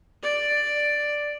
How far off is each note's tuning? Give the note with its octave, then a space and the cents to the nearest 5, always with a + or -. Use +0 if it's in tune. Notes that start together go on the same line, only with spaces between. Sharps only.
D5 +5